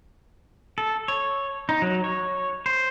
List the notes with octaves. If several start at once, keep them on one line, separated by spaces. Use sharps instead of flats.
A4
C#5
D#4
F#3
C#5
C5